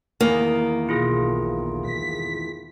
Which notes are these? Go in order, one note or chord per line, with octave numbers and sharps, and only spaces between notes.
E2 D#3 A#3
B1 E4 F4 G#4
B6